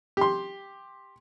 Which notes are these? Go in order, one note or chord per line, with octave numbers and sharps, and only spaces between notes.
G4 C6